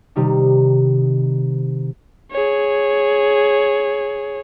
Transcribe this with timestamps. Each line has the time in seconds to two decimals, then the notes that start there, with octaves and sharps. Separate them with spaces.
0.16 C3 D#3 G3 D#4
2.32 G#4 C#5